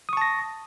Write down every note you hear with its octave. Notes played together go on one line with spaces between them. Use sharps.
A5 C#6 D#6 A#6